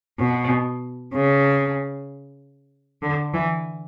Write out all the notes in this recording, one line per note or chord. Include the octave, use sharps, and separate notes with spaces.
B2
C#3
D3
E3